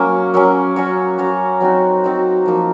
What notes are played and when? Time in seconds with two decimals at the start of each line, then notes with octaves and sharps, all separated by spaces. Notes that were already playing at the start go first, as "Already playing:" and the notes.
Already playing: F#3 A#3 C#4
0.34 F#3 A#3 C#4
0.76 C#4 F#4 C#5
1.18 C#4 F#4 C#5
1.61 F#3 C4 D#4 F#4
2.04 F#3 C4 D#4 F#4
2.46 F3 A#3 D#4